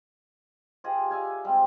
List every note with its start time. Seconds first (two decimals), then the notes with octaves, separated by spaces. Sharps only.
0.84 F4 G4 G#4 D#5
1.11 D5 E5 F5 G#5
1.45 G3 G#3 C4